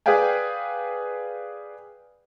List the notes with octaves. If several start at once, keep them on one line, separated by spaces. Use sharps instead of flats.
G#4 B4 D5 F5 G5 G#5